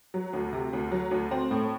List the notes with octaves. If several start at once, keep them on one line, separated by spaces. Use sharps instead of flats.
F#3
D2
C3
D2
F#3
D2
C4
A2